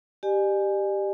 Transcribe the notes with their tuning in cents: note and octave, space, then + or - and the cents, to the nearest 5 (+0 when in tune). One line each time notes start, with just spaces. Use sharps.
G4 +0 D5 +45 G#5 +0